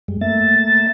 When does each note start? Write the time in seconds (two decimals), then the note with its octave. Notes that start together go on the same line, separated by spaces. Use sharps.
0.08 F#2 G3 G#3
0.21 A3 A#3 E5 A6